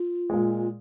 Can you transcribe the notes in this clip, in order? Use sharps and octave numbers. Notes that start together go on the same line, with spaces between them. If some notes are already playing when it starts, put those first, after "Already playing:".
Already playing: F4
A#2 G#3